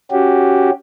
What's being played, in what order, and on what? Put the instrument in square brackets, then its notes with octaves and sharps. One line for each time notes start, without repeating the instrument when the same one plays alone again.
[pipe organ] C#4 F#4 G4